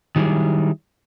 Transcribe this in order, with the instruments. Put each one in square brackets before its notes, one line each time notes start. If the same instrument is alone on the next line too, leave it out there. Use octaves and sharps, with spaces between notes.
[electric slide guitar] D#3 F#3 G3 E4 G#4